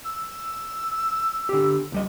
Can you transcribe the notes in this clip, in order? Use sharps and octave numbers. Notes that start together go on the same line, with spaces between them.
E6
D3 G4
C#2 G3 D#5